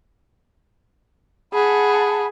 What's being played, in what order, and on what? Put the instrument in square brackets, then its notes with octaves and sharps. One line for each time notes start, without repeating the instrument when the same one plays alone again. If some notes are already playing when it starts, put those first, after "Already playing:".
[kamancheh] G#4 [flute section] F#5 A5 B5